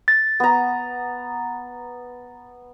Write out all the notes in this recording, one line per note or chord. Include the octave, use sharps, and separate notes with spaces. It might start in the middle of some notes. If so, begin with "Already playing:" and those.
A6
B3 A#5